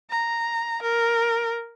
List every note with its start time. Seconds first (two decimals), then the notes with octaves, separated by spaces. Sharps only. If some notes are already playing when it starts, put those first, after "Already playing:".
0.10 A#5
0.82 A#4